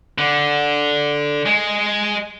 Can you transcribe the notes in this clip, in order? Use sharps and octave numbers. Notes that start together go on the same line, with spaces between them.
D3
G#3